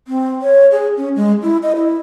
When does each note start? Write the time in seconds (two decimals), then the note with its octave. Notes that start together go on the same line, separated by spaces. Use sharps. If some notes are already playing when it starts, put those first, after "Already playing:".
0.08 C4
0.42 C#5
0.71 G#4
0.97 C#4
1.16 G#3
1.42 E4
1.63 D#5
1.76 E4